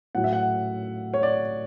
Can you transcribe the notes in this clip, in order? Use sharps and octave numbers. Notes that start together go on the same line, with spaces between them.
A2 F#3 F#5
E5
F#5
C#5
D5